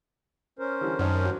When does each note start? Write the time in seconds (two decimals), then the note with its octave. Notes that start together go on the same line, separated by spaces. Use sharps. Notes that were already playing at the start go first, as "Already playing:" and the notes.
0.59 C#4 A#4 C5
0.81 D3 E3 G3
0.99 F#2 D#3 C#5 A5
1.24 G2 F#3